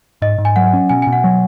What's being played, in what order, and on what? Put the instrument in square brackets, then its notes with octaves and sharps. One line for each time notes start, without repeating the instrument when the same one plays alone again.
[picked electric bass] G#2 [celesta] D#5
[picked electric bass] G#2
[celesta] G#5
[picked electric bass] F#3 [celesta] F#5
[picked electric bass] C#4
[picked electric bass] B2 [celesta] G#5
[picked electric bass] B2 [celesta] G#5
[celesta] F#5
[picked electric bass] F#3